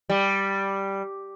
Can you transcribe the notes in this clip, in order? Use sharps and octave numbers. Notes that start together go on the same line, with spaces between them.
G3